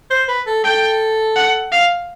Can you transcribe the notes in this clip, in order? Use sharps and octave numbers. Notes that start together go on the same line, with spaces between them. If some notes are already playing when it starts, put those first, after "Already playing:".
C5
B4
A4
A4 G5
F#5
F5